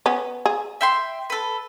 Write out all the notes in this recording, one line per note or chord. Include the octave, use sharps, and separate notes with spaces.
B3 C#4
G#4
E5 G5 C6
A4 B4